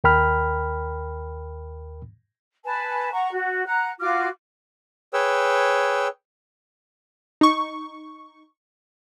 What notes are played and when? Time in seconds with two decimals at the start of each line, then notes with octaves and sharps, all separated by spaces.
0.04 D#2 A#4 G5 B5 F6
2.65 B4 G#5 A5
3.12 F#5 A#5 C#6
3.32 F#4
3.66 F#5 A#5 F#6
4.00 F4 F#4 D6 F6
5.13 G#4 B4 C#5 G5 E6
7.41 D#4 C#6